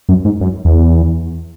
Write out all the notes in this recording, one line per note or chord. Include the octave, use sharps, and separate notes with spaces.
F#2
G#2
F#2
E2